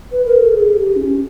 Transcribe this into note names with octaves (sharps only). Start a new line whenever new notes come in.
B4
A#4
A4
G#4
G4
C#4